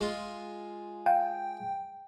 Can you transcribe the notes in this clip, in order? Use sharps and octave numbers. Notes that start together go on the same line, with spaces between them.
G#3 F4 D#6
F5 G5